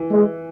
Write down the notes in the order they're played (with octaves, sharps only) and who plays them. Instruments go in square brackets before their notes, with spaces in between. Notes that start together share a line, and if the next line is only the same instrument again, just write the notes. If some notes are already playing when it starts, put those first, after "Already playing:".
Already playing: [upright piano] E3
[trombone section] G#3